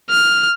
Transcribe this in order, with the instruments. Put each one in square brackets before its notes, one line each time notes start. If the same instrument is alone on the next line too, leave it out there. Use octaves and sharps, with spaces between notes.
[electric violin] F6